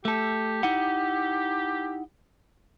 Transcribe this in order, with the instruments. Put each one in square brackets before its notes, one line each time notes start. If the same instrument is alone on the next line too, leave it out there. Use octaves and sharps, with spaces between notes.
[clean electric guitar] A3 A4 [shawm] G4
[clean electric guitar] D#4 E4 F#5